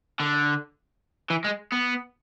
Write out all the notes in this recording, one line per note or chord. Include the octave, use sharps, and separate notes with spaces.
D3
E3
G#3
B3